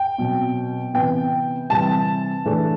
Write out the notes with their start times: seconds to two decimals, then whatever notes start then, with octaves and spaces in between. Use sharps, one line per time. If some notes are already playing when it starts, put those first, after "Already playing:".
Already playing: G5
0.18 B2 F#3 C4
0.94 C3 E3 B3 G5
1.70 C3 E3 G3 C4 A5
2.45 E3 A3 D4